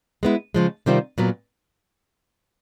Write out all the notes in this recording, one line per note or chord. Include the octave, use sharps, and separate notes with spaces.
G#3 B3 E4
C#3 F3 G#3
C3 D#3 G3 C4 F4
A#2 F#3 B3